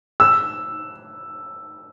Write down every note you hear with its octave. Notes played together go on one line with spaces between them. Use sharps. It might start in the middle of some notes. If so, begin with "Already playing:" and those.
E6